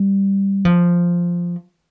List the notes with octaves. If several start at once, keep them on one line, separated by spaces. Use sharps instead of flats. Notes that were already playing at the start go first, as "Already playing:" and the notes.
Already playing: G3
F3